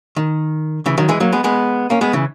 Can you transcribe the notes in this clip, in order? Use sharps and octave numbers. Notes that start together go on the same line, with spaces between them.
D#3
C#3 E3
D#3 F#3
E3 G#3
F#3 A#3
G#3 B3
G#3 B3
A#3 C#4
G#3 B3
C#3 E3